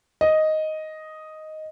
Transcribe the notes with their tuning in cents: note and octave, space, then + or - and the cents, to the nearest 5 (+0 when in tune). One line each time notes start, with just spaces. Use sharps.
D#5 +5